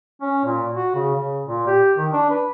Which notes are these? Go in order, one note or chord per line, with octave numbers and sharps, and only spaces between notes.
C#4
A#2
F#4
C#3
C#3
A#2
G4
D#3
D4
B4